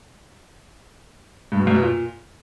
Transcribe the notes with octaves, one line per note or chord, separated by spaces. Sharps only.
G2
B2
F#2
B2
A#2